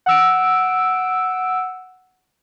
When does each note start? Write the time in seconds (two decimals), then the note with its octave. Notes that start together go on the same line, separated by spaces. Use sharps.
0.06 F#5 E6 D7